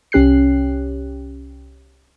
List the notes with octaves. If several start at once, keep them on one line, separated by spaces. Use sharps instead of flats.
C2 C#4 G4 F#6 C7